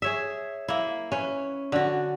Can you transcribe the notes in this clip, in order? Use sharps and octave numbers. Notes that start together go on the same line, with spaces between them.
G#4 C#5 E5
A#3 E4
C#4 B4
D3 F#4